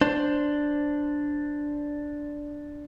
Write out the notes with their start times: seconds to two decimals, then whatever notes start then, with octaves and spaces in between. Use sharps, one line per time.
0.01 D4 C5